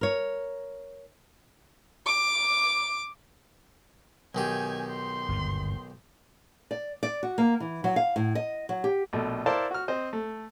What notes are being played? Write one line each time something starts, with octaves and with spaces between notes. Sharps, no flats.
A#4 C#5
D6
B1 D#3 G4 G#5
C6
G1 D#2 G#2
D5
D5
F#4
A#3
E3
F#3
F5
A2
D#5
F#3
G4
A#1 B2 A3
E4 A#4 C5 D5 F5 A5
F#4 F6
C4 C5 D#5
A3